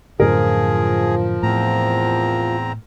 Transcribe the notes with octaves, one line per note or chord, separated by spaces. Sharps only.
F#2 A2 D3 F3 G#4 A#4
E2 A2 C4 A#5